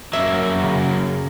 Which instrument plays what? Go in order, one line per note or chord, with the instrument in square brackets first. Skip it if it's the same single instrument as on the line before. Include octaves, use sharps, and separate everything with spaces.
[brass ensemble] F#2 [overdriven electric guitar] F#3 A#3 [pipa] E5
[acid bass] C#3